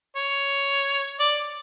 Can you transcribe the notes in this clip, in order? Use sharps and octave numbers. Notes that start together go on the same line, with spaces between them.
C#5
D5